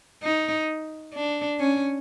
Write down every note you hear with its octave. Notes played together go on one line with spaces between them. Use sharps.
D#4
D4
C#4